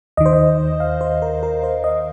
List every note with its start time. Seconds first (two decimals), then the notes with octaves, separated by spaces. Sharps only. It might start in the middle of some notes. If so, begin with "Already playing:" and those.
0.17 D#2 D#3 D#5
0.26 C5
0.33 D#5
0.80 F5
1.01 C5
1.22 A#4
1.43 A#4
1.63 C5
1.84 D#5